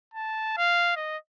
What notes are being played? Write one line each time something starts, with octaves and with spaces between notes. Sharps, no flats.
A5
F5
D#5